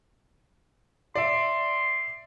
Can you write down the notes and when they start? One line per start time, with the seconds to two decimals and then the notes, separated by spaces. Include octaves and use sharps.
1.15 D5 E5 C6